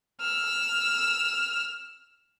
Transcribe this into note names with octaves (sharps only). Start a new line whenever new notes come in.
E6 F6